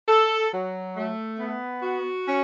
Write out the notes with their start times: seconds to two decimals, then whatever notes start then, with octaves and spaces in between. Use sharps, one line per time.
0.09 A4
0.53 F#3
0.97 A3
1.39 B3
1.82 F#4
2.27 C#4